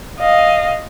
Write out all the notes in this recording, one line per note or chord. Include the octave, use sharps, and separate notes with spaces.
D#5 F5